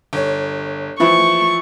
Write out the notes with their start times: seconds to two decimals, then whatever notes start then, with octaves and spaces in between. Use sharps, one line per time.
0.13 G1 C#5
1.00 E3 F3 E4 C#6